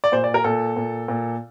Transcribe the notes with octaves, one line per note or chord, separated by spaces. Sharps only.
D5
A#2 C5
D5
A#4
A#2 A4
A#2
A#2